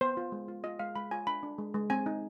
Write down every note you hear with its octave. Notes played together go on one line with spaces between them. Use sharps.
B3 C5
F4
G#3
F4
F4 D#5
G#3 F5
G#3 B5
F4 G#5
D4 B5
D4
G#3
G#3
C4 G#5
D#4